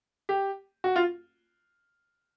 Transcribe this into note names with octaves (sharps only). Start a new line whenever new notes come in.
G4
F#4
F4